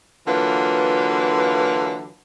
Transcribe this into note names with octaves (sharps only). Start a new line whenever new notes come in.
D3 E3 F#3 A#3 F4 B4